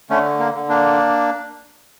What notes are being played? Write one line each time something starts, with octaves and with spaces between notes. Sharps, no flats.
D3 A3 C#4
A#3
D3
A#3 D4